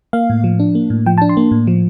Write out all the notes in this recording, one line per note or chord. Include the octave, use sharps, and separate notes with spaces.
A#3 F5
A2
F3
D4
A#3
A2
F3 G5
A5
D4
C6
A#3
A2
F3